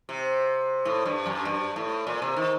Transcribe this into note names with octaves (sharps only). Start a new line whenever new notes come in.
C3
A2
G2
F#2
G2
A2
A#2
C3
D#3